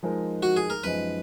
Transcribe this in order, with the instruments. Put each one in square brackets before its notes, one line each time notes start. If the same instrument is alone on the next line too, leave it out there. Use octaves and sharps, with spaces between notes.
[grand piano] F3 G#3 D#4 A#4
[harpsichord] F#4
G#4
A#4
[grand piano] F#2 F3 G#3 D#4 [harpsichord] B4